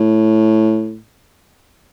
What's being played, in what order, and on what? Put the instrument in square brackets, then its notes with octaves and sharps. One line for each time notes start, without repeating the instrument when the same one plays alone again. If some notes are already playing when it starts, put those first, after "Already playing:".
Already playing: [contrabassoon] A2